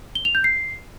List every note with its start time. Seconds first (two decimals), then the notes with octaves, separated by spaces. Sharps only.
0.15 G7
0.25 F7
0.35 G6
0.44 C7